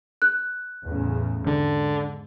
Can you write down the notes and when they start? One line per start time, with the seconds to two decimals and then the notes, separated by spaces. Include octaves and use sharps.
0.22 F#6
0.84 E2 A2 C#3
1.47 G#2 D3